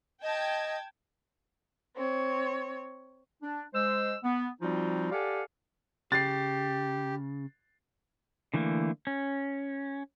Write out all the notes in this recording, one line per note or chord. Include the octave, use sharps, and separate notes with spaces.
D#5 G5 A5 G#6
C4 C#5
D4
G#3 C5 E6
B3
F3 G3 C4 D#4 F4 F#4
G4 A4 D5 F5 F#5 G#5
C#3 G4 A6 C7
D3 E3 A3 A#3
C#4